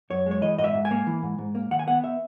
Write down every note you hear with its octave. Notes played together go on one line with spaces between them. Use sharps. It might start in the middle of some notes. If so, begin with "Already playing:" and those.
F#2 C#5
G#3 C#5
E3 D#5
G#2 D#5
E5
G#2
G#5
A#3
E3
G#2
G#2
A#3
D#3 F#5
G#5
B3 F#5
E5